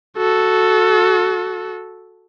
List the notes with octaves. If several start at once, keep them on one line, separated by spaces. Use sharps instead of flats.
F#4 A4